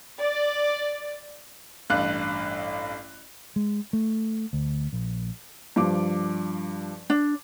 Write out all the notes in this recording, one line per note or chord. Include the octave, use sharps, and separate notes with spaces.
D5
A1 G2 F5 F#6
G#3
A3
D2
A#1
G2 F3 D6
D4